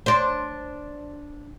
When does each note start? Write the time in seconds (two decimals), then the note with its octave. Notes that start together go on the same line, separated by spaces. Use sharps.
0.06 D4 C5